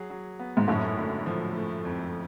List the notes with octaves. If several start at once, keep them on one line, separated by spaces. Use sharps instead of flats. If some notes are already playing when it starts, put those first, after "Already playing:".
Already playing: F#3 G#4
F#3
B3
G#2
F#2 A2 C#4
D3
F3
A3
F2